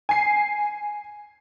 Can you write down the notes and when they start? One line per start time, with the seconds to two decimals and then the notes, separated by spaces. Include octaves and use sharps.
0.09 G#5 C7